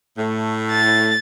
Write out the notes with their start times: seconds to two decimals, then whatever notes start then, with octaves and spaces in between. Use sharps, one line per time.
0.17 A2 A3
0.71 A6